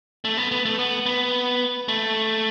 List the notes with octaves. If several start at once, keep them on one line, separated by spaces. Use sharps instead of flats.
A3
B3
B3
A3
B3
B3
A3